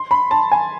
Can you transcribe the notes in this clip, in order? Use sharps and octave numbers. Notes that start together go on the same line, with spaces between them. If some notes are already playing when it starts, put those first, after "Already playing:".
Already playing: C6
B5
A5
G#5